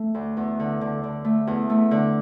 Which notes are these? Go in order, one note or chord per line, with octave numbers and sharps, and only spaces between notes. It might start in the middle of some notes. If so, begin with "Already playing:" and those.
Already playing: A3
D2
E2
D3
D3
D3
A3
E2
A3
D3